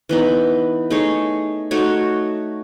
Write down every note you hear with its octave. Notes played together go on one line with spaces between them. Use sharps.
E3 B3 D#4
A3 D#4 G#4 C#5
A3 D#4 F#4 C#5